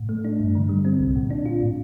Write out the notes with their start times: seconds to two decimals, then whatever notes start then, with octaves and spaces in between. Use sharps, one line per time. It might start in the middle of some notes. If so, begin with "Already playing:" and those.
Already playing: A2
0.09 A3
0.24 D4
0.40 G2
0.55 D3
0.69 G3
0.85 C4
1.00 C2
1.16 A#2
1.30 D4
1.46 F4
1.61 A2